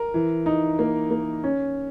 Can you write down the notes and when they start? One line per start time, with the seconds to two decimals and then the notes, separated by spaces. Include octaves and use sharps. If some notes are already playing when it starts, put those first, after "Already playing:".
Already playing: A#4
0.14 E3
0.46 D#4
0.79 A#3
1.11 A#3
1.44 C#4